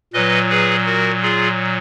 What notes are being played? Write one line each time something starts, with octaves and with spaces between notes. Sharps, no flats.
A#2 F#3 B4 D#5
G#4 B4
F#4 A#4
F4 G#4